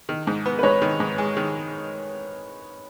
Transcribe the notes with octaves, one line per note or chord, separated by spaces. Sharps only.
D#3
G#2
B3
B4
G#2 C#5
D#3
G#2
G#3
D#3